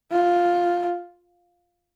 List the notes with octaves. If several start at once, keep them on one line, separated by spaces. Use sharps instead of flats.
F4